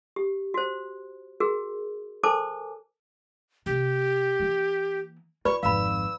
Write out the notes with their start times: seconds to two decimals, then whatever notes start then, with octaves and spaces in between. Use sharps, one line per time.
0.16 G4
0.54 F#4 C5
1.40 F#4 G#4 A#4
2.23 A4 A#4 C5 G#5 A5 D6
3.66 C3 A#3 G4
4.40 E3 A#3
5.45 F4 B4 D5 B5 C#6
5.63 G#1 F2 F5 B5 E6